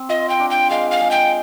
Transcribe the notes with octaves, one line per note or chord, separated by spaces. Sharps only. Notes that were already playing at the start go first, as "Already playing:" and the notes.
Already playing: C4
F4 D#5
G5
D4
G5
G#3 F5
F5
G#3
G5